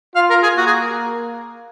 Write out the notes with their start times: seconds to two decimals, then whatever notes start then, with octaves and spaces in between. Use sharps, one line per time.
0.15 F4 F5
0.30 A#4
0.43 G#4
0.57 A#3 F#4
0.67 G#4